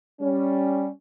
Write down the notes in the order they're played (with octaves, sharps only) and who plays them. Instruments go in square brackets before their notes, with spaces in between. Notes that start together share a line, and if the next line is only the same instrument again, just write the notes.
[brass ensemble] G3 C#4